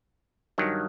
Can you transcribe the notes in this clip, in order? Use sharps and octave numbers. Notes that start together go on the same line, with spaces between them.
G2 D#3 F#3